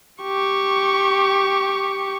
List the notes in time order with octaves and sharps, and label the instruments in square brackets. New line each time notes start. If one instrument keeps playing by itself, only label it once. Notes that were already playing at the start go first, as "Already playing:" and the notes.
[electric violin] G4 C#6